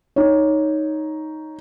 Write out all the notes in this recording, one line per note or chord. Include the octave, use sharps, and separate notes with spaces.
D#4 C#5